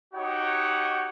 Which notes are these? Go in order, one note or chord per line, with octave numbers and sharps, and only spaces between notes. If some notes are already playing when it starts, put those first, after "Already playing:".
D#4 F#4 G4 C#5 F#5 G5